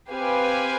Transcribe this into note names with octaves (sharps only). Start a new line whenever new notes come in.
C4 G4 B4 F5 G#5